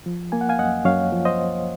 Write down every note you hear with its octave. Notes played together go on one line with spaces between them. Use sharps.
F3
A#3 G#5
F#5
F5 G#5
F#2 D#5 F#5
F#2 C#5 F5
F3
C5 D#5